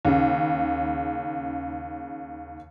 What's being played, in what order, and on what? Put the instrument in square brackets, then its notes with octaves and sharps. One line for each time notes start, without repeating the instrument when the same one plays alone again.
[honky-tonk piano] D#2 C#3